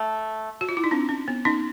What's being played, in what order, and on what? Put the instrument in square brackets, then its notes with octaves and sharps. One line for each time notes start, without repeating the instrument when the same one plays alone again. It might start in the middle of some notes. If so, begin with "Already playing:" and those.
Already playing: [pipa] A3
[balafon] F#4
F4
E4
D#4
C4 D4
C#4
B3
C#4 D#4